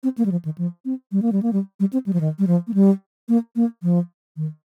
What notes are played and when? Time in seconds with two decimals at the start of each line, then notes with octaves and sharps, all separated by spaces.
0.03 C4
0.18 A#3
0.26 G3
0.32 F3
0.45 D#3
0.58 F3
0.85 C4
1.12 G3
1.22 A#3
1.32 G3
1.42 A#3
1.53 G3
1.80 G3
1.93 C4
2.06 G3
2.13 F3
2.20 D#3
2.39 G3
2.47 F3
2.68 A#3
2.74 G3
3.29 A#3
3.56 A#3
3.83 F3
4.37 D#3